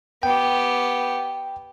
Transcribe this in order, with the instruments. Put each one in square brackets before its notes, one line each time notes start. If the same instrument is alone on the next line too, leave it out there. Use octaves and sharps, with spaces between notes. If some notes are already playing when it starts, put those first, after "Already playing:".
[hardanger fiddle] B3 G4 [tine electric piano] G5